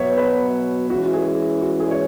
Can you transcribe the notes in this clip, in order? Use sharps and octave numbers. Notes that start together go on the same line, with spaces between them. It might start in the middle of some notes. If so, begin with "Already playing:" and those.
Already playing: B2 F#3 B3 C#5 E5
B4
E3 G#3 C#4 E4 F#4
G#4
F#4
G#4
C#5